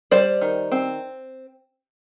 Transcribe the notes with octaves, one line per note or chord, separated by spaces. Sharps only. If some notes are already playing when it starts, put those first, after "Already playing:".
G3 C5 D5
D#3
C4